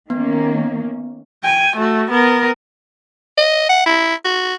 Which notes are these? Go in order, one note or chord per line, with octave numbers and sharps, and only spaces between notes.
D#3 A#3 B3 C#4
G5 G#5
A3 F#4
B3 A#4
D#5
F#5
E4
F#4